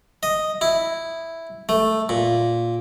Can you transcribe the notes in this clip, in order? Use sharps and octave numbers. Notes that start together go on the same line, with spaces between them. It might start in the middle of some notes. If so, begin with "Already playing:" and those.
D#5
E4
A3
A#2